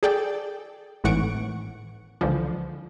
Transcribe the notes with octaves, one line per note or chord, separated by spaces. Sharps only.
G#4 A4 D5 G5
G#1 A2 E3 F#5 C#6 D7
C#2 D3 E3 F3